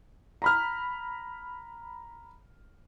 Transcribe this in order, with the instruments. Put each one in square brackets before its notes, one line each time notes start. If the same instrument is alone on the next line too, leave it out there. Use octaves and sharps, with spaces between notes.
[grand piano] A#5 B5 F6